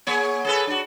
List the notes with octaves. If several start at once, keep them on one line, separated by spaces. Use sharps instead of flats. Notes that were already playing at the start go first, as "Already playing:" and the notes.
A#3 G#4 C#5
G#4 A4 B4
D4 F#4